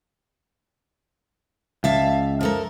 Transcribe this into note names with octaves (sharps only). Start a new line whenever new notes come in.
C#2 E5 F5 A5
F3 A4 A#4